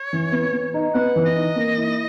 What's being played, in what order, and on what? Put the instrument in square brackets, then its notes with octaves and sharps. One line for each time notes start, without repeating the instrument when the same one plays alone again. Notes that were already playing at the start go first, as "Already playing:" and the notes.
Already playing: [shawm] C#5
[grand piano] E3
B3
B3
D#4
[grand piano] B3 [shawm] F#5
[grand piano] E3
[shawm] D#5
[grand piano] D#4
A#3
E4